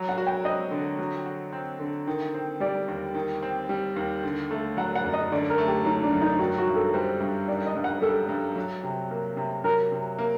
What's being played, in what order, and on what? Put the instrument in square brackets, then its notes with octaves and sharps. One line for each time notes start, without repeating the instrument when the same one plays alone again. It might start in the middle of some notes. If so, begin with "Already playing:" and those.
Already playing: [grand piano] F#3
[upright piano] F#5
[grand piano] F#4
[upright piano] G5
[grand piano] C4 [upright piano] D#5
[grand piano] D3
F#3
F#4
C4
D3
D#3
C4
[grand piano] G3 [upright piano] D5
[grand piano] D#2
D#3
C4
G3
D#2
D3
A3
[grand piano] F#3 [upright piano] F#5
[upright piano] F#5
[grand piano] F#2
[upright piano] D#5
[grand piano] D3 [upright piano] D5
[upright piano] A#4
[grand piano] A3
[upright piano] G4
[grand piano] F#3 [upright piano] D#4
[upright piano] D4
[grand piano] F#2
[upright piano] D#4
[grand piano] D#3 [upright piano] F#4
[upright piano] F#4
[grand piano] G2
[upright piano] A4
[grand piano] G3 [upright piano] C5
[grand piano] G2
[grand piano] D#3 [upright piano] D5
[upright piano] D#5
[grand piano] G2
[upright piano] F#5
[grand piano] G3 [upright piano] A4
[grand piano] G2
F#3
C3
A#3
C3
[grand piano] F#3 [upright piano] A#4
[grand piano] C3
A#3